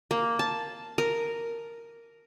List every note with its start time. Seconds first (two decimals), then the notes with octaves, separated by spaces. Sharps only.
0.11 A#3
0.39 A5
0.98 A#4